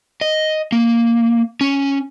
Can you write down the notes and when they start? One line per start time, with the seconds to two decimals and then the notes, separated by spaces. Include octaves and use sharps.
0.21 D#5
0.72 A#3
1.61 C#4